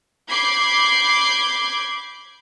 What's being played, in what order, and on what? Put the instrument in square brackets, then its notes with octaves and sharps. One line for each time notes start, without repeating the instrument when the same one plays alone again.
[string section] B5 D6 G6 G#6 C7